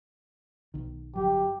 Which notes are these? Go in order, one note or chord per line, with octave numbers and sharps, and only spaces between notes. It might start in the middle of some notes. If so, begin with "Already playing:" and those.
B1 D#3
G1 G2 F#3 G4